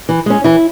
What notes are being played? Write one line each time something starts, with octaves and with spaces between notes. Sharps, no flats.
E3
G#3 C#4
E3 E4